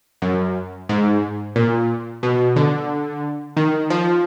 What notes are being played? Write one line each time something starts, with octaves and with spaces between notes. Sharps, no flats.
F#2
G#2
A#2
B2
D3
D#3
F3